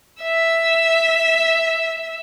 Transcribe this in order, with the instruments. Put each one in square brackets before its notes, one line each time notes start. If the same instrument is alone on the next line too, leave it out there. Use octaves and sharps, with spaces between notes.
[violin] E5 E6